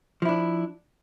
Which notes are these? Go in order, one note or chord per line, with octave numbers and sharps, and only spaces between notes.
F3 D4 E4